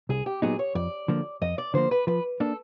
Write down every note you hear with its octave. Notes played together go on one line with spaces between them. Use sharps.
C2 G#4
G4
A#2 F#3 B3 D#4 G#4
C#5
F2 D5
D3 F3 A#3
F2 D#5
D5
D3 F3 A#3 C5
B4
F3 B4
A#3 D4 A4